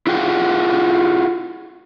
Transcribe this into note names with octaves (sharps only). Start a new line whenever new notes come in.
E4 F4 G#4 F#5 G5